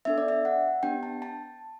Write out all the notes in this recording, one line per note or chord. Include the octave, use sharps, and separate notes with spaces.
B3 D4 A4 E5
D5
E5
F#5
B3 D4 G4 G5
A5
A5